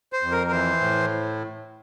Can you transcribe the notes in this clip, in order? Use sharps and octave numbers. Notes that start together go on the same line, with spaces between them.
C5
F2
A#4
A#4
E3 C5
A2